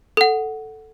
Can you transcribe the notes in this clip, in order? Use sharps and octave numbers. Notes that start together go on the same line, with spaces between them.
A4 F#5